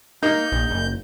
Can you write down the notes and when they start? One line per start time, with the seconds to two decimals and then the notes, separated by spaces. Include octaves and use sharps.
0.23 A#3 D#4 G6
0.52 A#1
0.71 F#1